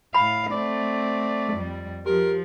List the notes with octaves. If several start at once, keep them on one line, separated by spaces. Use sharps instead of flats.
A2 F5 B5
A3 C4 D5
F2 G3
F3 G4 A#4